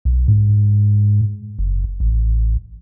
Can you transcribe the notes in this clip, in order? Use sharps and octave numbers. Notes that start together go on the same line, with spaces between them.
B1
G#2
F#1
A1